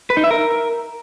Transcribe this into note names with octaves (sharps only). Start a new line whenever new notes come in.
B4
D#4
E5
A#4